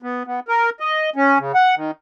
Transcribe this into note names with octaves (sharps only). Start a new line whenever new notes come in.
B3
B3
A#4
D#5
C#4
C#3
F#5
D#3